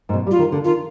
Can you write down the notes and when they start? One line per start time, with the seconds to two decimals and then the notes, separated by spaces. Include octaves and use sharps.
0.09 G#2
0.13 B2
0.27 G3
0.31 F4
0.39 D#3
0.52 D3
0.64 D#3 F4